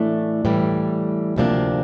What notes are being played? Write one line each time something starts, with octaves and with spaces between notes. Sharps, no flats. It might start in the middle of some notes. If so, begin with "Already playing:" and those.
Already playing: A2 E3 A3 D4
A2 E3 G3
D2 C3 F3 A#3 D4